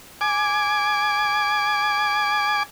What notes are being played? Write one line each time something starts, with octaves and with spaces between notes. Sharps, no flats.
G#5 D6